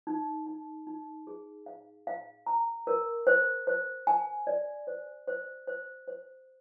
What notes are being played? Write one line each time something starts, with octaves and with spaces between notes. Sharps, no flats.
D#4
D#4
D#4
G#4
F5
F5
A#5
A#4
C5
C5
G#5
D5
C5
C5
C5
C5